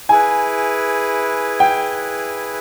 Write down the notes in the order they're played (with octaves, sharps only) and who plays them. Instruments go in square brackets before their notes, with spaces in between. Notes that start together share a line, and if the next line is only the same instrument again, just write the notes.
[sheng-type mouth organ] E4 G#4 B4 [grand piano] G#5
[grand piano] G5